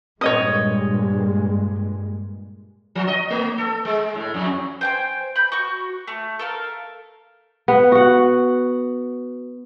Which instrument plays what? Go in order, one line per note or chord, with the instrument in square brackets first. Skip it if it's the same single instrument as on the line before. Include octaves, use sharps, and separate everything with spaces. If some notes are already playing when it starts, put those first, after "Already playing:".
[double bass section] G2 A#2 G#3 [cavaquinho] C#5 D#5 D#6
[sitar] F3
D#5
A3
A4
G#3
A2
F2
[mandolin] C5 G5 G#5
B5 G6
F#4 C#6
A3
A4 A#4 F5
[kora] B3
F#4 F#5